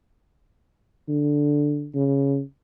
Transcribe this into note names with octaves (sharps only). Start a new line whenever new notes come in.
D3
C#3